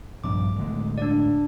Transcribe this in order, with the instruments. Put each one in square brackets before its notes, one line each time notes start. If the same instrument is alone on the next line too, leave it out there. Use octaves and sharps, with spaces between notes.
[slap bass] A#1 G2 [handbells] D6
[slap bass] A2 D3 G#3
[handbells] D4 D5